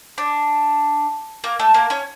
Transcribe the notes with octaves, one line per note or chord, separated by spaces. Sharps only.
D4
A#3 A#4
A3 A4
A#3 A#4
C#4 C#5